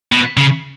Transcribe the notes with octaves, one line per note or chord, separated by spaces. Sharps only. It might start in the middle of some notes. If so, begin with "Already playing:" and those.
B2
C#3